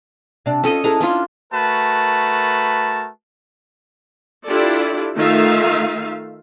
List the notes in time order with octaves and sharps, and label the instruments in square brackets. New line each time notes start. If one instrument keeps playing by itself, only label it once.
[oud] C3 D4
[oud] C4 F4 [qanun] C#4 A4 D#5
[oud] G#3 E4 A4 [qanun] A#5
[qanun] C#4 D4 F4 [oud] E4
[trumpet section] A3 F#4 A#4 B4 A5
[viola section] D4 E4 F4 G4 A4 D5
D#3 A3 D#4 F4 E5 F5